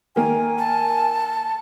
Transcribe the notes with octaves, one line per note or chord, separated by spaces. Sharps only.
D#3 A#3 G#5
A5